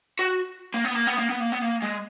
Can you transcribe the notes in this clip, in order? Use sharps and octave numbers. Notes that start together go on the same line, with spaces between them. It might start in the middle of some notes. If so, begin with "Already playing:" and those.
F#4
A#3
B3
A#3
B3
A#3
B3
A#3
B3
A#3
G#3